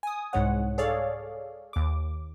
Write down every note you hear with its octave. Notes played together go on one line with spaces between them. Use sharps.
G#5 D#6
C2 G#2 G#3 C#5 F#5
G#4 A4 C#5 D5 F5
D#2 D6